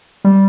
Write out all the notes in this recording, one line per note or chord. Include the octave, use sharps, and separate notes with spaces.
G3